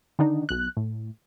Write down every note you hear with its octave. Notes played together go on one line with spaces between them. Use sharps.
D3 D#3 D4 D#4
B1 F#6
A2